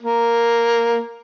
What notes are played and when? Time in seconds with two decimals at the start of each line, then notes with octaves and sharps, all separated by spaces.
0.02 A#3